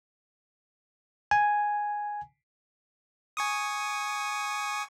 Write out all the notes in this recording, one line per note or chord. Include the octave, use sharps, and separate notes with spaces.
G#5
G#5 C#6 D#6